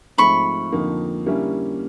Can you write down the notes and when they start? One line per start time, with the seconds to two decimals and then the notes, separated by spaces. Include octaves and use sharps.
0.18 G#2 F3 A3 C4 B5 C#6
0.72 F2 D3 F3 A#3 D#4
1.26 D3 G3 A#3 C#4 E4